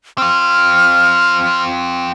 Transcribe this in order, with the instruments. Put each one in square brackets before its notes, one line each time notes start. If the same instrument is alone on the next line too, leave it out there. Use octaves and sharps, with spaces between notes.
[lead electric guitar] C4 F4 [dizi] F6